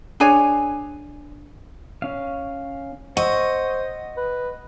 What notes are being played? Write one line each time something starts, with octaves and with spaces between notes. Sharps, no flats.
D4 G#4 C#5 G#5
C#4 F5
C5 D#5 F#5 C#6 E6
B4